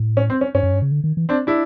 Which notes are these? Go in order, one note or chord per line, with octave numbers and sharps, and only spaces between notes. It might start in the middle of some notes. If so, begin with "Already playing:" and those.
Already playing: A2
C#4
C4
C#4
G2 C#4
F#2
G2
C#3
D3
D#3
E3
C4 D4
D4 E4